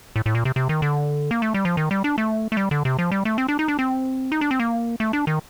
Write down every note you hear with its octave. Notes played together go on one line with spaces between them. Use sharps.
A2
A2
A#2
C3
C3
D#3
D3
A#3
A3
G3
F3
D#3
G3
D4
A3
A3
G3
D3
C3
F3
G3
A3
C4
D4
D#4
D4
C4
D#4
D4
C4
A#3
A3
D4
D#3